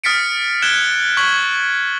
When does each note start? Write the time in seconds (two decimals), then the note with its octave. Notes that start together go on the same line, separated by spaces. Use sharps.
0.04 D#6 F6 A6 B6 C#7 D7
0.62 F#6 G#6 D7 E7 G7
1.17 C#6 G#6 B6 F#7